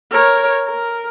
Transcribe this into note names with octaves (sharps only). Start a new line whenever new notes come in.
A#4 C#5
A#4